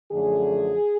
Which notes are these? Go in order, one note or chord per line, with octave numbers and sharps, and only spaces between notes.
F#2 D3 F3 A3 G#4